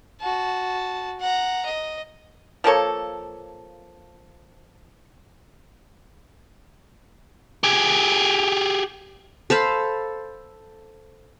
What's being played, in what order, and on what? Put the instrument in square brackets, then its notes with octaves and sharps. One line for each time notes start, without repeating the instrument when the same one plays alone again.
[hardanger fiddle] F#4 A5
F#5 A#5
D#5
[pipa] F3 A#3 A4 C#5
[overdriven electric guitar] G4 G#4
[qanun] A4 C5 F5 B5